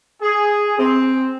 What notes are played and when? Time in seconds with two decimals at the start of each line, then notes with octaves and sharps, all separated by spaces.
0.22 G#4
0.78 C4